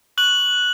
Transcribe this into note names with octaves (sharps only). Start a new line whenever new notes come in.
C#6 F#6 F#7